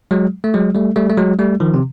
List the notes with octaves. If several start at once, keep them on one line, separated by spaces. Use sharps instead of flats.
F#3 G#3
A3
F#3 G#3
G3 A3
G3 A3
A3
F#3 G#3
G3 A3
D#3 F3
C3